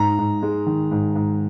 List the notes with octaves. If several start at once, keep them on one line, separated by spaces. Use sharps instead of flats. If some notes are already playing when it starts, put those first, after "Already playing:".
Already playing: G#2 A#5
G#2
G#3
D#3
G#2
G#2